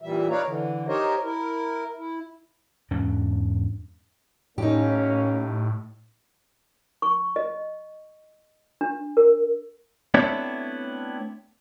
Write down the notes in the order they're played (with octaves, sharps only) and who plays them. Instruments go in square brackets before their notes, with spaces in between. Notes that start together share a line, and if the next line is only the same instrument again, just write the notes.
[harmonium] A#2 E3 G3 E5
D#4 B4 C#5 D5 F5 A#5
D3 E3
D#4 G4 A#4 C5 C#5 D#5
E4 A#4
E4
[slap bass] E2 G#2 C#4 D4
[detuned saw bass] A2 [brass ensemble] A#3 C#4 [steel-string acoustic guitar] D#4 G4
[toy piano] C#6
D#5
D4
A#4
[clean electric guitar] A3 B3 C4 D4 E4 C#5